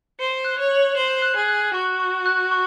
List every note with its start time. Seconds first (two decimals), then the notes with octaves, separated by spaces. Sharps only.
0.19 C5 C#7
0.45 F#6
0.57 C#5
0.71 F#7
0.96 C5 F#7
1.22 F#6
1.35 G#4
1.48 F#6
1.74 F#4 C#6
1.99 C#6
2.26 F#6
2.51 C#6